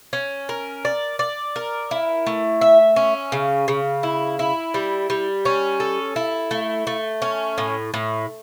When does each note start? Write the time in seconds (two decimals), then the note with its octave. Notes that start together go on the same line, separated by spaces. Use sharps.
0.13 C#4
0.49 A#4
0.85 D5
1.19 D5
1.56 A#4
1.91 E4
2.27 A3
2.61 E5
2.96 C#4
3.32 C#3
3.68 C#3
4.03 E4
4.39 E4
4.74 G3
5.10 G3
5.45 C#4
5.80 A4
6.16 E4
6.51 A3
6.87 A3
7.22 C#4
7.58 A2
7.94 A2